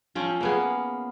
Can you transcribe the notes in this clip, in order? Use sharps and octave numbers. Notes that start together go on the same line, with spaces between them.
F3 C4 C#4
A#3 B3 G#4